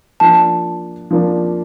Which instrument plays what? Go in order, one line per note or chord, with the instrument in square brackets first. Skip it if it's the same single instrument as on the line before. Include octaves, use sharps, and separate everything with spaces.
[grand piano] F3 A#3 D4 [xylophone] A5
[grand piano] F3 A#3 D4